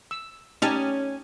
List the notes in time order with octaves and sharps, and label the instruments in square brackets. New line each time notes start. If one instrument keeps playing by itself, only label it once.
[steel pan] E6
[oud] C#4 C#5 [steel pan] D#4 G4 A5